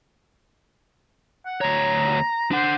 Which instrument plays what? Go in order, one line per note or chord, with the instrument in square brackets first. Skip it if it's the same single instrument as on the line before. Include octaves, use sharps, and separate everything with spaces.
[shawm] F#5
[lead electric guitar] D2 C#5 [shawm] A#5
[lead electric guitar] D4 F#5 [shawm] C5